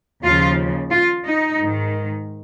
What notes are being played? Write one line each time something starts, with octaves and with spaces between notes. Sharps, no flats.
D#2 C#3 F3 F4
F4
D#4
G#2 D#3